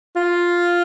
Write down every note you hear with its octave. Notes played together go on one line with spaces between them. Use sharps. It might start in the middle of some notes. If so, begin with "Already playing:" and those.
F4